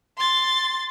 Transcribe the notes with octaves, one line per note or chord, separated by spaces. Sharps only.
C6 A6